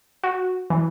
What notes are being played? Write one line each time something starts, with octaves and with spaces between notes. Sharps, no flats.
F#4
E3